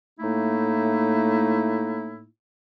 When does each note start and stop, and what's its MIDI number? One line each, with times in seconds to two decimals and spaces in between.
0.20 2.24 45
0.20 2.24 57
0.20 2.24 58
0.20 2.24 63
0.20 2.24 64